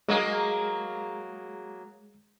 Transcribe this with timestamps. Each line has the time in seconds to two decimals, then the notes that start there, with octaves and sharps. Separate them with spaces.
0.09 F#3 G#3 A#3 G#4